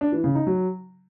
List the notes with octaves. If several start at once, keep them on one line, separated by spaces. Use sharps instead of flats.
D4
E3
C#3
D#4
F#3